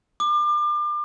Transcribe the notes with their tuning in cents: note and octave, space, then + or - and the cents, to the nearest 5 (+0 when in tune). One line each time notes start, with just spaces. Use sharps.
D6 +35